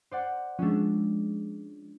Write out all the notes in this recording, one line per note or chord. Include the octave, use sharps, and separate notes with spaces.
C5 D5 F#5
F3 G#3 C#4 D4